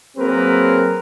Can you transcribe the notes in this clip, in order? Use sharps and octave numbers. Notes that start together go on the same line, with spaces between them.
F#3 A#3 C4 G#4 A#4 B4